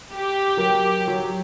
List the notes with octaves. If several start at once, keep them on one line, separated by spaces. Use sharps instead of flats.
G4
F#3 A#4
F#3